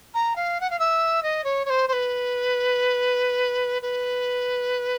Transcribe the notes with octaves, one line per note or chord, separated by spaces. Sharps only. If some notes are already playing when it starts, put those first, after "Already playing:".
A#5
F5
F#5
F5
E5
D#5
C#5
C#5
C5
C5
B4
B4